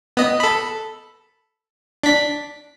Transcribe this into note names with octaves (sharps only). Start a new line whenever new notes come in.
B3 D#5
A4 B5
D4 B6